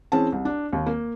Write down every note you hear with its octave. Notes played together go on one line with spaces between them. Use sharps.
E3 C4 C#4 G#4 A5
C2
D4
D#2
A#3